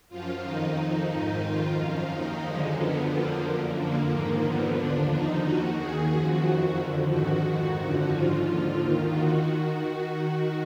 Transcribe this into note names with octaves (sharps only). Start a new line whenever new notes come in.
F#2 F3 F4
F2 D#3 D#4
F2 F3 D#4
G#2 D#3 D#4
F2 D#3 F4
F#2 F3
D#2 D#3 D#4
F#2 D3 F3 G#3
F#2 D3 F3 B3
F2 D3 F3 A#3
F#2 D3 F3
F2 D3 F3 A#3
G#2 D#3 A#3
D#2 D3 F3 B3
D#2 D3 F3 D4
F2 F3 D#4
D#2 D#3 F#4
D#2 D#3 G#4
F#2 F3 F#4
F2 D#3 F#4
F2 D3 F3
G#2 D#3 F#4
F2 D#3 F#4
F#2 D3 F3 F#4
G#2 F3 F4
D#2 D3 F3
D#2 D#3
D#3 F#4